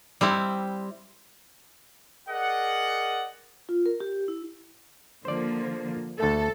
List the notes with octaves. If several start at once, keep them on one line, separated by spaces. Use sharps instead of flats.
G3 C4 E4
G#4 A#4 D5 D#5 F#5
F4
A#4
G4
E4
D3 F3 A#3 C5 D5
D2 A3 A4